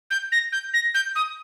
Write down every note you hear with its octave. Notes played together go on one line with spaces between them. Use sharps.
G6
A#6
G6
A#6
G6
D#6